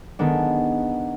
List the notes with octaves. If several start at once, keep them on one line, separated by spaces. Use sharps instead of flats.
D#3 G#3 B3 D4